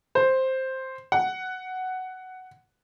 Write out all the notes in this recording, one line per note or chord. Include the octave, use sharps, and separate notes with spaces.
C5
F#5